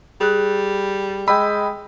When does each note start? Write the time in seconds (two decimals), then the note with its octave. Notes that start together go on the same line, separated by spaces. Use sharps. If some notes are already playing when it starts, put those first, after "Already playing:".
0.21 G3 G#4 F#6
1.28 G#3 G5 B5 E6